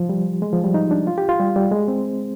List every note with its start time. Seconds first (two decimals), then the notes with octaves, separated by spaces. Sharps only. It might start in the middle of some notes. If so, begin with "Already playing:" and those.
Already playing: F3
0.09 G3
0.42 G#3
0.52 F3
0.64 G3
0.74 D#4
0.91 D4
1.07 F4
1.18 G4
1.29 F4
1.40 G3
1.56 G3
1.71 G#3
1.88 C4